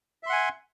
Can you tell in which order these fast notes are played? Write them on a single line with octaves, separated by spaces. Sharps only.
E5 C6 F#5 G#5